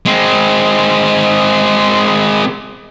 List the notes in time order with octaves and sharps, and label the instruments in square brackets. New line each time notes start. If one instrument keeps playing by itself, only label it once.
[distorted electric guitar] G#3 C4